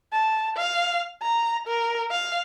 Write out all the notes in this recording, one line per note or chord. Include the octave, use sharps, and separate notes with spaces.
A5
F5
A#5
A#4
F5